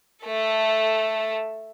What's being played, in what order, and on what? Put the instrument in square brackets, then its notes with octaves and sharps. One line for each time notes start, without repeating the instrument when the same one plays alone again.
[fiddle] A3 A4